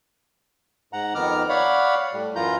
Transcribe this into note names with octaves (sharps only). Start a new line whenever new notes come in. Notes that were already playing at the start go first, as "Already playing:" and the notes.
G#2 F#5 A#5
F2 D#3 B3 A#5 D6 F6
C#5 D5 F5 F#5 B5
A2 G3
F#2 E3 F4 A#5 G6